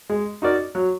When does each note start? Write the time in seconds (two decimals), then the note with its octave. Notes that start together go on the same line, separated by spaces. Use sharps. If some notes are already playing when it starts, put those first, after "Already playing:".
0.10 G#3
0.42 D#4 F#4 A#4 D5
0.75 F#3